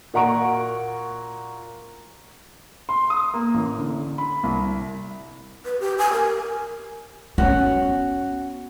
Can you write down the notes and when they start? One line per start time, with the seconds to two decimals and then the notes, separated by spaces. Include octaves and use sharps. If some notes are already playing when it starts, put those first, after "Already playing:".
0.14 A#2 F#4 F#5 A#5 C#6 D7
2.89 C6
3.10 D#6
3.34 A#3
3.54 A1
3.78 D3
4.18 B5
4.43 C2
5.65 B4
5.80 G4
5.98 G#5
6.13 A#4
7.38 B3 C#4 F#4